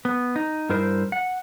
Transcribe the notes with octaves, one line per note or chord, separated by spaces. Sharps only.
B3
D#4
G2 E4 A#4 C5
F#5